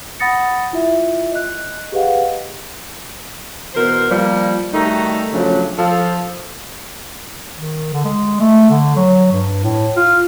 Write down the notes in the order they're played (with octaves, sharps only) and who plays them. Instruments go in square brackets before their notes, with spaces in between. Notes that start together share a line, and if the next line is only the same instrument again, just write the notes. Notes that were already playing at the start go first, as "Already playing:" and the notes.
[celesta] F#5 B5 D#6 A6 A#6 C#7
E4 F4 E5
D#5 F#6
G4 G#4 B4 D#5 F5 F#5
[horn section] B2 E3 A#4 C5
F3 G3 A#3
D#3 G3 A3 D#4 F#4 A#5
C#3 F3 F#3 A3 D4
F3 A4
[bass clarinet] D#3
D3
G#3
A3
D3
F#3
G2
A2
F4